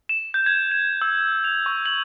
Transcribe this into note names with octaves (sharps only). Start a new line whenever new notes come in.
E7
G6
G#6
E7
E6
F7
C#6
F#7